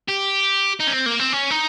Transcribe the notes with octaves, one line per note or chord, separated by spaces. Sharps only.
G4
D#4
C#4
C4
A#3
C4
C#4
D#4